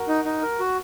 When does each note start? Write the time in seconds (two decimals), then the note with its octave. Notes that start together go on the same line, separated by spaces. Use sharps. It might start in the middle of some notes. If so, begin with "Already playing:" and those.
Already playing: F#4 A#4
0.08 D#4
0.25 D#4
0.42 A#4
0.60 F#4